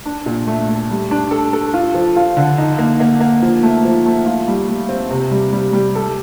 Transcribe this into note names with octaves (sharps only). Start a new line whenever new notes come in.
D4
A#2
A3
A3
G3
D4
A4
A4
F4
F3
F4
D3
D#4
A#3
A#3
A#3
F3
A3
F3
A3
F4
G3
G3
C4
C3
G3
G3
G3
A4